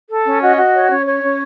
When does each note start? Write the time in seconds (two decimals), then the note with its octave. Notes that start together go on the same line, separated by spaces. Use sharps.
0.09 A4
0.25 C#4
0.41 F#4 D#5
0.57 F#4
0.74 C#5
0.90 C#4 C#5
1.06 C#5
1.22 C#4